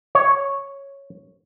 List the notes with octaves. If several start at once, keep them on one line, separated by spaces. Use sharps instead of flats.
C#5